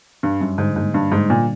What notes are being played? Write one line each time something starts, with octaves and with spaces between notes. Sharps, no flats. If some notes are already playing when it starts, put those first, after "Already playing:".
G2 D4
F#2 G3
G#2 D3
G#2 A#3
G2 D4
G#2 G3
A#2 D3